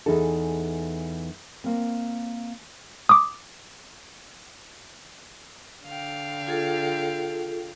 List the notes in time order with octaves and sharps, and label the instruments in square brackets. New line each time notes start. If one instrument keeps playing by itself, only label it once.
[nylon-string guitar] E2 E3 D#4 G#4 A4
A#3 C4
[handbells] D6 D#6
[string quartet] D3 F5 G5
[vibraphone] F4 G#4 A4